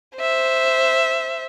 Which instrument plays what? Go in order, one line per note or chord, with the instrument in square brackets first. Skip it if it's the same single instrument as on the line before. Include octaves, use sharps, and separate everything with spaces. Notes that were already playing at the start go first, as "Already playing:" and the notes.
[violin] C5 E5